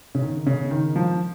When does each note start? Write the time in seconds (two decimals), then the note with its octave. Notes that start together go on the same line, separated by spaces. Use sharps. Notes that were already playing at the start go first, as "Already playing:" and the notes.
0.15 C#3
0.22 D#3
0.47 C#3
0.71 D#3
0.96 F3